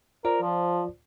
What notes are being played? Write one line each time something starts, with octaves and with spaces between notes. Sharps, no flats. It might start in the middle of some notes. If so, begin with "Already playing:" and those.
F4 A#4 C5 D5
F3